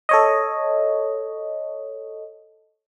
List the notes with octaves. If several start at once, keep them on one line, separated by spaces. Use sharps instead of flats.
A4 C#5 D#5